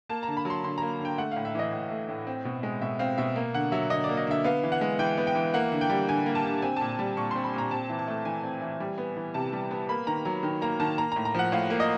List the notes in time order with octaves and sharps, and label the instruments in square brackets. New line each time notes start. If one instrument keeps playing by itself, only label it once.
[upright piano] A#3 A5
A#5
D3
B5
F#3 C6
D3 C6
A#3 A#5
D3
G5
A3 F#5
A2 F5
E5
E3 D#5
A2
A3
A2
C4
B2
G#3
B2 E5
C4 F5
B2 E5
A#3
D3 F#5
F#3 E5
D3 D#5
D5
A#3
D#5
D3 E5
B3 F5
E3
F#5
G#3
E3 G5
B3
G5
E3
A#3 F#5
D3
G5
G3
D3 G#5
A#3
A5
D3
C4 G#5
A#2 A5
G3
A#2 C#6
C4 C6
B5
A#2 A#5
C4 A5
E3
A5
A3
E3 G#5
C4
E3
G3
B3
E3
C3 A5
G3
B3
A#3 B5
D#3 A#5
F#3 A#5
D#3
A#3 A#5
D#3 A5
A#3 A#5
A2 A#5
A#5
F3 F#5
A2 F5
A#3
D#5